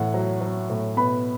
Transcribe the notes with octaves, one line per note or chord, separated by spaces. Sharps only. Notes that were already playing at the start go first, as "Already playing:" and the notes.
Already playing: A2 E3 F#5
F#3
F#3
A2
B2 B4 B5